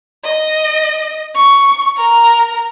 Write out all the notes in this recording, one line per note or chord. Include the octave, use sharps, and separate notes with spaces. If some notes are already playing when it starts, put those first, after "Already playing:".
D#5
C#6
A#4